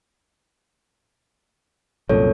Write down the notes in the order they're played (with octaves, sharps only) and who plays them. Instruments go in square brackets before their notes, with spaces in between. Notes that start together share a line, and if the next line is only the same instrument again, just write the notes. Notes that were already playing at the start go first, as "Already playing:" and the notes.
[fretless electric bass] C2 F#2 A#2 [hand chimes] A4 C#5